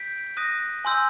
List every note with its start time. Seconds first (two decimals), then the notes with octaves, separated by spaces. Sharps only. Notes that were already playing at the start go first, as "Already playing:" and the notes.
Already playing: G6 B6 D7
0.37 D#6 F#6 A#6 D#7
0.85 G#5 C6 E6 G6